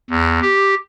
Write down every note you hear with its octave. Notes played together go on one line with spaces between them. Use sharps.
E2
G4